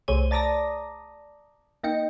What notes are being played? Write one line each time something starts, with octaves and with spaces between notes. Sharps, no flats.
C2 A3 G#4 C5 C#5 D#7
D5 A5 A#5 D6 D#6 A#6
A#3 D#4 D#5 G5 C#7